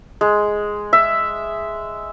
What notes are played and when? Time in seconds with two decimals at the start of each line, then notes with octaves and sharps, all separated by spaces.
0.21 G#3
0.93 E5